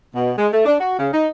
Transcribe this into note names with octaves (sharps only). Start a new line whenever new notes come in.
B2
G#3
A3
D4
F#4
C#3
D#4